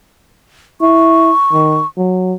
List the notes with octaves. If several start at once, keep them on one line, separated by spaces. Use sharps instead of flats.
E4 C#6
D#3
F#3